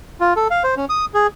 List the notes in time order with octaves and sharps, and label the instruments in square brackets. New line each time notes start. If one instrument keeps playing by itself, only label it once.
[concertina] F4
A4
F5
C5
C#4
D#6
G#4